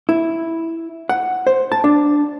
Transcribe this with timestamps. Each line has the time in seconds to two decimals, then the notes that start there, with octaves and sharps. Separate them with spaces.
0.09 E4
1.09 F#5
1.47 C5
1.72 A5
1.84 D4